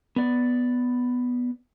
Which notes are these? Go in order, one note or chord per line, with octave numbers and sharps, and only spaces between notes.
B3 D5